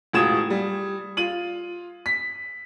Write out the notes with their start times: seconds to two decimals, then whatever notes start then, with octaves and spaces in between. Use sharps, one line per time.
0.13 E1 A2 F4 D#6 G#6 E7
0.50 G3
1.17 F4 D#7 F#7
2.06 B6